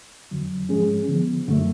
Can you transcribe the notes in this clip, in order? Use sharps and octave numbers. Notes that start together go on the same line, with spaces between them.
F2 D3 F#3
G#2 F3 G#3 C#4 G#4
D3 F3 B3
F#2 D3 F#3 A3